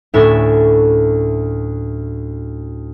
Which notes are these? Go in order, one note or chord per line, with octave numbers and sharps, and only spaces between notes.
D2 A2 C#4 E5 A6 E7